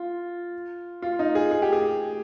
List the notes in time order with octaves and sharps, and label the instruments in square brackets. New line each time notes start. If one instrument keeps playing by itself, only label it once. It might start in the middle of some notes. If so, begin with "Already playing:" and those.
Already playing: [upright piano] F4
F4
D#4
G#4
G#4
G4
G#4